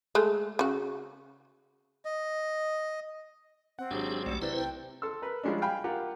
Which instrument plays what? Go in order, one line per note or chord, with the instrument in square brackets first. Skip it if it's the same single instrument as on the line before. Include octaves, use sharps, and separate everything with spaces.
[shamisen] G#3 A3
C#3 F#4
[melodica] D#5
[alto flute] C4 [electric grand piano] F#5
[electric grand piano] G#1 F#3 [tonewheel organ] D4 G4 G#4
[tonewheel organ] B1 A3 D5
[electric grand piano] C3 [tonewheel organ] E4 B4 C5 [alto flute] D5
[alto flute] G5
[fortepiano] A4 C6 E6
A#4 B4
F3 G3 G#3 C#4 D4
F5 G5 G#5 B5
F4 G4 A#4 F#5